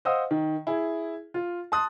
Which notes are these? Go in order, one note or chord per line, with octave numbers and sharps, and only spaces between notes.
C5 D#5 F5 F#5 D#6 E6
D#3
E4 G#4
F4
A5 C6 D#6 F#6 A6